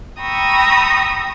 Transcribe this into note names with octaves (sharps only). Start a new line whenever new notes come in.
G5 A#5 B5 C#6 D#6 E6